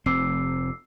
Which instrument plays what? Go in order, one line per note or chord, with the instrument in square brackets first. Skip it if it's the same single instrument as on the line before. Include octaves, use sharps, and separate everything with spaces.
[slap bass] F1 C4 [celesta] D6 E6 C7